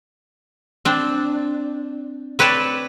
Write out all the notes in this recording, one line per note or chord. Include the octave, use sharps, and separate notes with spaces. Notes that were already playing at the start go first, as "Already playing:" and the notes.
C4 D4
C4 B4 C#5 D5 A5